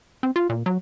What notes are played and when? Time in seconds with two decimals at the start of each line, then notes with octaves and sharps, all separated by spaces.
0.23 C4
0.36 F4
0.50 A#2
0.66 F#3